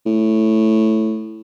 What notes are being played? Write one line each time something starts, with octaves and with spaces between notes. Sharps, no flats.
A2